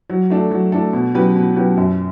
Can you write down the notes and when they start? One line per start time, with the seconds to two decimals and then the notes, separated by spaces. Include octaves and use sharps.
0.10 F#3
0.30 A3 D4 A4
0.51 F#3
0.72 A3 D4 A4
0.93 B2
1.14 F#3 C#4 G4 B4
1.35 B2
1.56 F#3 C#4 G4 B4
1.77 F#2